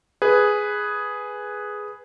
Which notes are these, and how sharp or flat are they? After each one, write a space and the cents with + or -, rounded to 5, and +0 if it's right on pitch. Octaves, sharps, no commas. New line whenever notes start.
G#4 +0 B4 +0